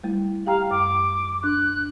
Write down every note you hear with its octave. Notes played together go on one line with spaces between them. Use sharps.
G3 A3 E4
G4 F5 G5 A#5
F#2 D6
D4 F#6